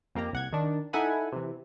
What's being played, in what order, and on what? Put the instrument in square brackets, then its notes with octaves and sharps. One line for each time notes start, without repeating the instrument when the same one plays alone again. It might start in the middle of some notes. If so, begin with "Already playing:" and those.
[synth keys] F2 A#3 G4 A#5
C2 F#5 G#6
D#3 D4
D#4 E4 A4 F#5 G#5 B5
C3 E3